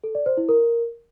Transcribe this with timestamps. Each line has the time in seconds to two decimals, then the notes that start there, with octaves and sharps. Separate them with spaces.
0.04 A4
0.15 D5
0.26 C5
0.37 E4
0.49 A#4